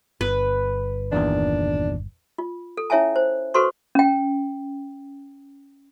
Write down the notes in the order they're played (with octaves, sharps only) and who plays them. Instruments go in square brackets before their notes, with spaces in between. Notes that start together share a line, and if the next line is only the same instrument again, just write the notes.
[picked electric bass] G1 [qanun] B4
[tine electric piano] E2 A#2 D#3 [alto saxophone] D4
[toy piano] F4
A4
C#4 E4 C#5 E5 G#5 A5
C5
F#4 A4 B4 C5 C6 C#6
C#4 G5